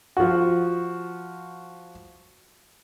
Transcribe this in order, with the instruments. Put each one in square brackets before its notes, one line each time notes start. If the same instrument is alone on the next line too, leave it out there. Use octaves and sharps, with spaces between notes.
[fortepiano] F3 F#4